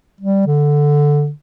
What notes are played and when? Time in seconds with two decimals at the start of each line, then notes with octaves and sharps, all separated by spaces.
0.21 G3
0.47 D3